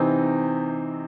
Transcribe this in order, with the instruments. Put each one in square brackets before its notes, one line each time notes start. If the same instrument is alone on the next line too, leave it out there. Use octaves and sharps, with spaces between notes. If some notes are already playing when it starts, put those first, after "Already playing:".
Already playing: [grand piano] C3 E3 C4 D#4